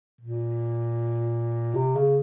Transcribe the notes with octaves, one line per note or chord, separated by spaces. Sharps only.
A#2
C3
C#3